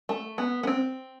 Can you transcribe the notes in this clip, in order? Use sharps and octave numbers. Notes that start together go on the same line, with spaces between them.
A3
B3
B3
C4